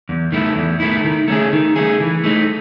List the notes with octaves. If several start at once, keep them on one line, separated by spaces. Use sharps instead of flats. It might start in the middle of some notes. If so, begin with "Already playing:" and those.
E2
D#3 A3 E4
E2
D#3 A3 E4
D#3
A3 C#4 G#4
D#3
A3 C#4 G#4
E3
A3 D#4